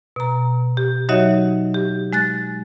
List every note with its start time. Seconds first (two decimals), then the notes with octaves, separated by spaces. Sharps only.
0.16 B2 A#5
0.77 G4
1.09 F#3 D#4 F#4 C#5 D#5 E5
1.74 G4
2.13 G#3 F#6 A6